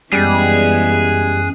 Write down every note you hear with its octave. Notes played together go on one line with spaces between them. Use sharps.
F#2 E3 G3 G#3 B3 G#4 F#6